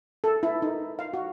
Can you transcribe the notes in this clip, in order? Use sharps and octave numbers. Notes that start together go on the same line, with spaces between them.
A4
E4
D#4
F5
F#4